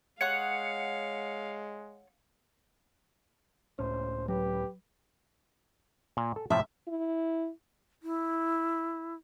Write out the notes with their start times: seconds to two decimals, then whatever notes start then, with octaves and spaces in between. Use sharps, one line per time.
0.21 G#3 C#5 F5 F#5 D#6 C#7
3.79 C#2 A2 C#4 C5
4.28 F#3 G4 B4
6.17 A#2
6.36 A4
6.50 A2 C3 F3 E5
6.88 E4
8.03 E4